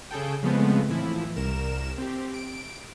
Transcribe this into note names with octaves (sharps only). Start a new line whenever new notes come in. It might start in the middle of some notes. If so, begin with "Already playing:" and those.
C#3 G#4 A4 G5
C#3 F3 G#3 A3 B3 C4
A2 E3 F3 E4
C2 A#4 E7
C4 G4
D7